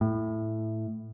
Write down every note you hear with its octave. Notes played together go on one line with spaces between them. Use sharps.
A2